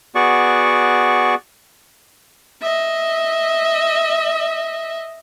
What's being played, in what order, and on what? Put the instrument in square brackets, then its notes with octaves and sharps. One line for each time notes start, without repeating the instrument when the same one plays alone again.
[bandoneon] B3 F#4 G#4 D5 C#6
[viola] D#5 E5